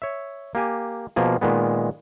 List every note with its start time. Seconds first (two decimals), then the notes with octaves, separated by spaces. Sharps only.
0.02 C#5 E5
0.55 A#3 G4 G#5
1.16 B2 F3 A#3 G#4
1.41 A#2 D#3 G#3 B3